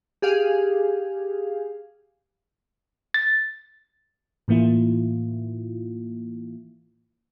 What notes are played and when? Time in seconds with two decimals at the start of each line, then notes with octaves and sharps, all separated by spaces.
0.22 G4 G#4 F5
3.14 A6
4.48 A2 E3 A#3 E4 F4